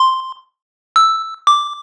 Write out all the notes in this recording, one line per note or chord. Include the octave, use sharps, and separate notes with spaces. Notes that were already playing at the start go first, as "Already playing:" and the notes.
Already playing: C6
E6
D6